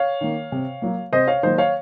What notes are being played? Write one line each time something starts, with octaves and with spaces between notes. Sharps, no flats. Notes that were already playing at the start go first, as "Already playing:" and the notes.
Already playing: C#5 F5
D#3 A#3
C3
F#3 A#3
C3 C5 D#5
C#5 F5
D#3 F#3 A#3 C5 D#5
C#5 F5